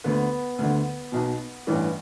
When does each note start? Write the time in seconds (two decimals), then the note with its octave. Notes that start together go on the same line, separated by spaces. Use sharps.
0.04 D2 D3 B3
0.58 D2 D3
1.12 B1 B2
1.67 A1 G2 E3